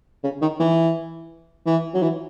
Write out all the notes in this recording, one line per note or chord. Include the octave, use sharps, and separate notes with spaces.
C#3
D#3
E3
E3
F#3
E3